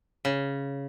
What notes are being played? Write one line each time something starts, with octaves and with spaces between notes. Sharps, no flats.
C#3